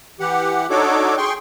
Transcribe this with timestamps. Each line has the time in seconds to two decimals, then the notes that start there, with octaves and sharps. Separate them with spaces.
0.20 E3 G4 F#5
0.70 D4 D#4 F#4 A4 C#5 D6
1.17 G#4 G5 C6 C#6